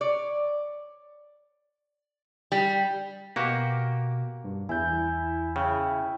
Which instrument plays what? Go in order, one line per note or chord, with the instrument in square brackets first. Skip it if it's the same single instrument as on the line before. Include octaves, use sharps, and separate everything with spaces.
[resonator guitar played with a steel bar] C#5 D5
G3
[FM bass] B2 [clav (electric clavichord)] A#3 F#4 G4
[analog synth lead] G2
[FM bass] E2 [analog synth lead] E4 [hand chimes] G#5 G6
[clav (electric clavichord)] C#3 [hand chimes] G5